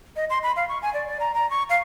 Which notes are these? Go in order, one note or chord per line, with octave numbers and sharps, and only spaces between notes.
D#5
C6
B5
F5
C#6
G#5
D5
D5
A#5
A#5
C#6
F5